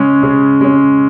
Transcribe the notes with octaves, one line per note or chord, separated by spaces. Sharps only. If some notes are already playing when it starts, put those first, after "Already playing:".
Already playing: C#3 G#3 C#4
C#3
G#3 C#4